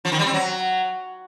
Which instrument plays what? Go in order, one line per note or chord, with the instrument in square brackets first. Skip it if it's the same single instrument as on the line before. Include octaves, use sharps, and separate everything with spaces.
[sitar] F3
D#3
G3
C4
F#3